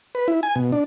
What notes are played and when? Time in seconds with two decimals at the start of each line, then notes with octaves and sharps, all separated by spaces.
0.15 B4
0.28 E4
0.43 G#5
0.56 B2
0.72 D4